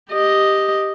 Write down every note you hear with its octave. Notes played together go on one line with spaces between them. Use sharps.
G4 D#5